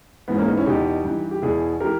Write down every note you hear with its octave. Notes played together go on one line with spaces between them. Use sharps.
G#2 E3 B3
A#3 C#4
B3 D#4
C#4 E4
E2 B2 D#4 G4
G2 E3
G4
E2 B2 E4 G#4
E3 G4 A#4